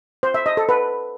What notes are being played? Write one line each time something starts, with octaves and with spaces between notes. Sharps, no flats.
C5
E5
D#5
A4
B4